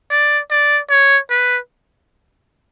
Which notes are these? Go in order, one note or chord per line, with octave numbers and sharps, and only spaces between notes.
D5
D5
C#5
B4